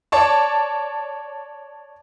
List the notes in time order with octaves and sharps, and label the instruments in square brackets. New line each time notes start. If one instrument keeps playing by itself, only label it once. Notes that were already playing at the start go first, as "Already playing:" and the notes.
[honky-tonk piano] C#5 D5 A5